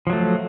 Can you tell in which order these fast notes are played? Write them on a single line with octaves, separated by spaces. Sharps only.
F3 F#3 A3